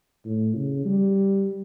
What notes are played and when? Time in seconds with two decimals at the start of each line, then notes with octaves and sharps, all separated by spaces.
0.25 A2
0.56 C#3
0.85 G3